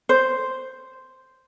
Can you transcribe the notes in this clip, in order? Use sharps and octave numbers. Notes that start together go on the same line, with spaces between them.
C5